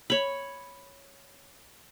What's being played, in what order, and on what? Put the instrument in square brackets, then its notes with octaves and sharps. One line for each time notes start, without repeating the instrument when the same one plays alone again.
[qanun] C#5 B5